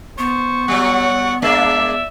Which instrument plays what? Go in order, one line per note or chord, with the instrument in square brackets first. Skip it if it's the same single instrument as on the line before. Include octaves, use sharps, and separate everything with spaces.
[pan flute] B3 [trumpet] C5 [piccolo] C#6
[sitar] F#3 G3 [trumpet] F#5
[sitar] G#3 A#3 D4 [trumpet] D5 [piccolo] E5